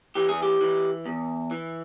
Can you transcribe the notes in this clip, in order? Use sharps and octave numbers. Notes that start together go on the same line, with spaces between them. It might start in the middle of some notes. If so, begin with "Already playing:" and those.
E3 G4
G#4
G4
E3
E2
E3